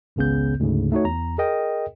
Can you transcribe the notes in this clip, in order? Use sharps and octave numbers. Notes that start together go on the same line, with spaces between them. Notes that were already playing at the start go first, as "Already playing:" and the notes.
G#1 C#2 C#3 B3 G6
D2 G#2 C#3
A3 D#4 F#4 C#5
E2 A#5
G#4 A#4 D#5 G5